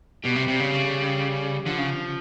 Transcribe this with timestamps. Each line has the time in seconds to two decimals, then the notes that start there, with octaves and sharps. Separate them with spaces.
0.24 B2 G3
0.36 C3
0.48 C3
0.60 C#3
0.71 G3
1.66 D3 F3
1.78 C#3